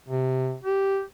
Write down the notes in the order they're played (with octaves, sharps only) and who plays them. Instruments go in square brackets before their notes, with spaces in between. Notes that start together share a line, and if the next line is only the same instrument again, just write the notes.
[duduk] C3
G4